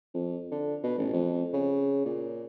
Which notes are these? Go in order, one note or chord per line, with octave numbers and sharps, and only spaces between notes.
F2
D3
B2
A1
F2
C#3
A#2